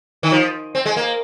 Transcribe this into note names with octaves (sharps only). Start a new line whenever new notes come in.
D#3
F3
C4
G#3
A#3